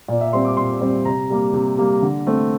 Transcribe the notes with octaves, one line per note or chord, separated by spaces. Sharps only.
A#2 D5
E5
G3 C4 C6
D6
A#2 C6
G3 C4
C3 A#5
G3 A#3
C3
G3 A#3
D3
A3 C4